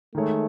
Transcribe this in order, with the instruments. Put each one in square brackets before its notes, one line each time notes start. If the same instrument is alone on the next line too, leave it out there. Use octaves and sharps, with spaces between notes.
[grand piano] D#3 G#3 D#4 G#4 C#5 [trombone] A3